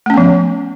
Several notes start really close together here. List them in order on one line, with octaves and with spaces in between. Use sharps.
A3 C#4 B3 F3